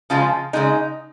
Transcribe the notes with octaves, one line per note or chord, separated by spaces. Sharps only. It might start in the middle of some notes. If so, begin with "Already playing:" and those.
C#3 F3 G#3 F4
C#3 F3 G#3 D#4